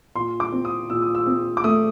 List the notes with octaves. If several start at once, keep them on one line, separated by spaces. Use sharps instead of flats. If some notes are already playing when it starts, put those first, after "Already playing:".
A#2 C6
D6
C4
D#6
A#2 E6
D#6
E6
C4
D6
A3 D#6